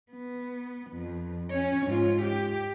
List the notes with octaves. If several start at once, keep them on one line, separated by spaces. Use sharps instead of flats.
B3
F2
C#4 C#5
G#2 F4
G4